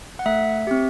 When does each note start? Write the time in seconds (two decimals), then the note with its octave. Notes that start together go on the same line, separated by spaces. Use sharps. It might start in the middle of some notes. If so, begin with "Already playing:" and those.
0.19 F#5
0.26 A3 E5
0.67 C4 G4